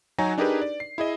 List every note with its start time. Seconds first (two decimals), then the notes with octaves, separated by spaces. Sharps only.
0.18 F#3 D#4 F#4 G#5 A#5
0.38 D4 D#4 G4 G#4 A#4 B4
0.62 D5
0.80 C7
0.98 E4 G#4 D#5